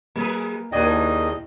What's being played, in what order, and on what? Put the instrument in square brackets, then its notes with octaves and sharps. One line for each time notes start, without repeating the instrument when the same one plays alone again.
[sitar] F#3 G#4 B4 [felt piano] A#3
[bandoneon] D#2 D#5 [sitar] A#3 D4 G#4 [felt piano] E4 D5 G5